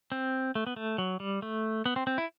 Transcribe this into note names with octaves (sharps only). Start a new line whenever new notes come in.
C4
A3
B3
A3
F#3
G3
A3
B3
C4
C4
E4